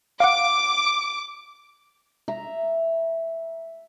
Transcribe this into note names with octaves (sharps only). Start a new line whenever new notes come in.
F5 F#5 D6
E5 A#5